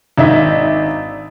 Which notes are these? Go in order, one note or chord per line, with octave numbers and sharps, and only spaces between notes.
G#1 D4 D#4 E5